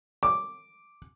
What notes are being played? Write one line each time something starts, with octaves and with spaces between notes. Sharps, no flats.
D6